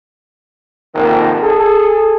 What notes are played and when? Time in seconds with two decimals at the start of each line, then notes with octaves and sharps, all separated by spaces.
0.95 G#1 F2 C3 D#3 A#3 A#4
1.43 G#4 A4